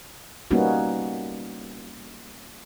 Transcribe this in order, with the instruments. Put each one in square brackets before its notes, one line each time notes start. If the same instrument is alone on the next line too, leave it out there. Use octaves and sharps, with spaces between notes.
[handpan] G3 A#3 B3 C#4 D#4 F#4